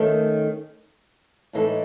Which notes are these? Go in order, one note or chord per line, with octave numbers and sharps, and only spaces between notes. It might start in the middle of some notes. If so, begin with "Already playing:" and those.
Already playing: D#3 A3 C#4
A2 E3 G#3 D#4 A4